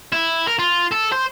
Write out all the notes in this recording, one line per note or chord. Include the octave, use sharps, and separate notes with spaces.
E4
A#4
F4
A4
C5